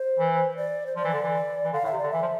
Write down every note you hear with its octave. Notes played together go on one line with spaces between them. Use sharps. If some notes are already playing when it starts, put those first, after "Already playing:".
Already playing: C5
E3
D5
C5
F3 D5
E3
D3
E3
E3
D3 F5
A2 E5
C3
D5
D3
E3 E5
F3